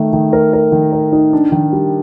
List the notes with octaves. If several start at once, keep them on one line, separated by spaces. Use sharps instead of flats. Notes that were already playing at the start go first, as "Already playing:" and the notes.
Already playing: D#3 A3
D#3
A#4
A#4
D#3
A#4
D#4
D4
D#3
G3